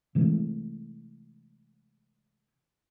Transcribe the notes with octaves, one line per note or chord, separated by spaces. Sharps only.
C3 E3 G#3 A3